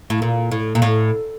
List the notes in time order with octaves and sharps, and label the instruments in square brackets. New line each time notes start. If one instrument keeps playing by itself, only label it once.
[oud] A2
A#2
A2
A#2
A2